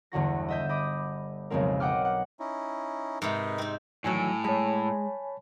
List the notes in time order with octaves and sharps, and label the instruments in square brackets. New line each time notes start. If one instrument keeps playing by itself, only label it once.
[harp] G1 E2 D3 F#4 A#6
D#5 E5 G6
D#5 B5 D6 D#6
B1 F2 C#3 G#3 C4 A#4
D#5 F#5 G5 D6 F6
F#5
[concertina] C#4 D#4 E4
[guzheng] G#2 C3 D#4 [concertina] A#4 B4 D#5
[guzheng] C4 D#4
[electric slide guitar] A2 [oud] D#3 E3 F#3 [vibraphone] G#5
[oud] G#3 [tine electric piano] C#5 A5 B5